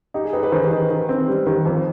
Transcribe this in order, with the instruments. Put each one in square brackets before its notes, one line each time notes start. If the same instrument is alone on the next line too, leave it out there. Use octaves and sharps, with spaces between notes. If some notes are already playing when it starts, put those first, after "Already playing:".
[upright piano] D#4 [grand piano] G4
[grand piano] G#4
[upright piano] D#4 [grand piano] G4 B4
[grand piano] G4 B4
[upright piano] D#3 [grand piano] G#4 C5
[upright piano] D#3
D#3
C4
G3
D#3
F2